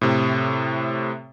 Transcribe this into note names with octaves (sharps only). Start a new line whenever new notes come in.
A2 C3